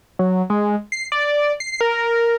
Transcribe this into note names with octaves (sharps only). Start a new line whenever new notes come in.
F#3
G#3
C7
D5
C7
A#4